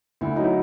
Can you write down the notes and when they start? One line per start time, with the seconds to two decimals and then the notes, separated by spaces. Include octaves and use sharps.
0.21 D2 E4
0.36 F#3 D#4
0.44 E4